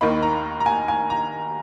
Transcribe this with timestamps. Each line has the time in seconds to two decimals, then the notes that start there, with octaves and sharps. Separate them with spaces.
0.01 D#2 D#3 A#3 D#4 B5
0.22 A#5
0.60 A#5
0.66 G#5
0.88 G#5
1.10 A#5